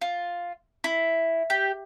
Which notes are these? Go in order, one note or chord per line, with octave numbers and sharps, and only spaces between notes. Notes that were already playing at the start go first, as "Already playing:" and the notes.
F4
E4
G4